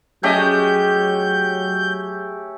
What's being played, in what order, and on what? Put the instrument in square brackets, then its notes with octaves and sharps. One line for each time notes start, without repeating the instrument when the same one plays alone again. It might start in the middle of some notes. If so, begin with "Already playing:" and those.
[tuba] F#3 [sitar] G#3 D#5 [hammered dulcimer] A3 C#4 G4 [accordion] G6